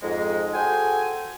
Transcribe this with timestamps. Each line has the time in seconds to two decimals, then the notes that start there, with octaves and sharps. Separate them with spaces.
0.02 F2 G#2 G#3
0.53 F#4 G#4 A4 C5 G5 G#5